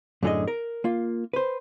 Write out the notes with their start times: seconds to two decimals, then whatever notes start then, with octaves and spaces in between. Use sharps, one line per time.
0.23 F#2 A2 D3 G4 G#4 D#5
0.48 A#4
0.84 A#3 F4
1.33 B4 C5